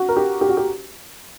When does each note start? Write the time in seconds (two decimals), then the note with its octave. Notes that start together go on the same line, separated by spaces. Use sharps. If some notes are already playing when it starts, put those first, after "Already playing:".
Already playing: F#4
0.09 A#4
0.16 G4
0.41 G4
0.49 F#4
0.57 G4